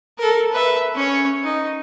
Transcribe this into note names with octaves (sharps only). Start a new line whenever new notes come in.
A4 A#4
B4 E5
C#4 C#5
D#4